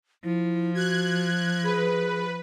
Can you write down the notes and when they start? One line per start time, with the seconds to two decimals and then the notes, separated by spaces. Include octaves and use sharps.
0.24 F3 E4
0.75 F#4 F#6 G#6
1.64 G#4 B4